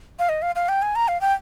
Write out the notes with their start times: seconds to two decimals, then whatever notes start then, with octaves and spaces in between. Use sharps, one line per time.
0.19 F5
0.29 D#5
0.42 F5
0.56 F5
0.69 G5
0.82 G#5
0.96 A#5
1.08 F5
1.21 G5